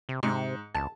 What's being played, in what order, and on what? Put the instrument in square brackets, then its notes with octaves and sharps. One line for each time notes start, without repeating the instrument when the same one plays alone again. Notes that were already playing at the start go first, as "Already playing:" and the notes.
[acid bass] C3
[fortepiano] G#2 [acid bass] C3
[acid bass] C#2 [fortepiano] A5